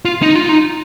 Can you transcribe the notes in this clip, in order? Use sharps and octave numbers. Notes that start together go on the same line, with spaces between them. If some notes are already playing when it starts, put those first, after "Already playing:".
F4
D#4
F4
D#4